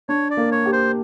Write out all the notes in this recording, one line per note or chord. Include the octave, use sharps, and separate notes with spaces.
D4 C#5
D5
A#3
C#5
G4
C5